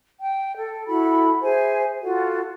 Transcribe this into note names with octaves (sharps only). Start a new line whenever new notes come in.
G5
A4
E4 F#4 A4 B5
G#4 C5 E5 G#5
F4 F#4 A4 F#5